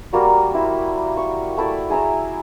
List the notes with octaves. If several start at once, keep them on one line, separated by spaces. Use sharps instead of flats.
G3 A#3 F#4 D5
E4 C5
C#6
A3 E4 D5
G#4 A#5 E6